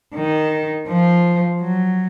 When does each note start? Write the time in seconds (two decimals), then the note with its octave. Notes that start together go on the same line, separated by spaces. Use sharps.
0.14 D#3
0.88 F3
1.62 F#3